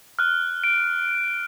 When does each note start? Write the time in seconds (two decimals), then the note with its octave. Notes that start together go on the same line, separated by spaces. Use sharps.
0.19 F6 F#6
0.64 D7